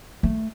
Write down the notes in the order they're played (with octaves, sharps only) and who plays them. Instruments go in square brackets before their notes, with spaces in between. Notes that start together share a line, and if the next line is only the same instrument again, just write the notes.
[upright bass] A3